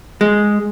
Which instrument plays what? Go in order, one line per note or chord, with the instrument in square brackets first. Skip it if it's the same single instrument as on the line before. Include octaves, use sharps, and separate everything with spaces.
[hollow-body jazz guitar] G#3